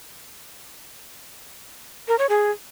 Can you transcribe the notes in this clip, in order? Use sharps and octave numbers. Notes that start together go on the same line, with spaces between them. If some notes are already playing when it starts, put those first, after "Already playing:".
A#4
C#5
G#4